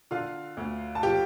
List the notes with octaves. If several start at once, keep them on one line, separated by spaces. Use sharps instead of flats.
D3 F4 F5
D2
A5
F3 G4 G5